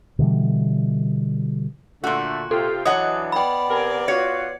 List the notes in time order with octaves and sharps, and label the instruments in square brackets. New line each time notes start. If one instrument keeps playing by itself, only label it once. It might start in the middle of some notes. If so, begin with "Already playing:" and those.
[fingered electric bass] B2 D3 E3 G3
[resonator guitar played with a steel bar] A#2 F#4 [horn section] D3 A3
[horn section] C3 F4 G5 [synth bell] A4
[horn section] E3 F#3 D4 [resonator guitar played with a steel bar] C#5 D#5 F#5 [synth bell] D#6
[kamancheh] B3 D5 [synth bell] G5 B5
[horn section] C3 A#4 G#5
[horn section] F4 F#4 [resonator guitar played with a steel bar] C#5 [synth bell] C#7